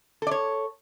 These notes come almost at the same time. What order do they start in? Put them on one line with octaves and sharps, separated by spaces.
A4 D5 C#5